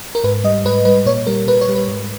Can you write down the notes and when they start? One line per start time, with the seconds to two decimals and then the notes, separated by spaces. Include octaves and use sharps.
0.15 A#4
0.24 G#2 B4
0.44 G3 D#5
0.64 G#2 B4
0.85 G3 B4
1.06 A#2 C#5
1.27 G3 A#4
1.47 A#2 B4
1.61 C#5
1.68 G3
1.76 B4
1.88 G#2